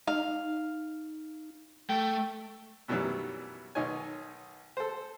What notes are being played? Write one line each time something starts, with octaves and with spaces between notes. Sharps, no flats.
D#4 F5
A3 G5
F#2 B2 D#3 E3 F#3 G3
B1 D#3 D#4 C#5 G#5
A4 C5